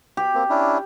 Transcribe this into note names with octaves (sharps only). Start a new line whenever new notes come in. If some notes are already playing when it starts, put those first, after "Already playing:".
G4
A#3 C4
C#4 D4 E4